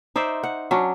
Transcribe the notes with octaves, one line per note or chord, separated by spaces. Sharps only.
D#4 C5 D5 E5
F#5
F#3 C#4 D4